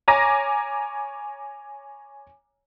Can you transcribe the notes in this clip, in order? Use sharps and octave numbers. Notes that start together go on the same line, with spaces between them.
C#5 G#5 A#5 D6 A#6